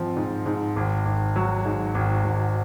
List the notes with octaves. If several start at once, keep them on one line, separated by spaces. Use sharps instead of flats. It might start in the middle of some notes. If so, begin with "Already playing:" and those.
Already playing: G#2 F3 C4
G#2
G#2
G#1
G#1
F#3
G#2
G#1
G#1